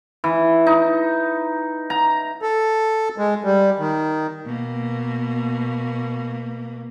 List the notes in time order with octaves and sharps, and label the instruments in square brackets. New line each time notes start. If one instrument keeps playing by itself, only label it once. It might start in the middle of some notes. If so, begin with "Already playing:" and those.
[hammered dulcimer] E3
D#4
A#5
[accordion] A4
G#3
G3
D#3
[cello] B2 A#3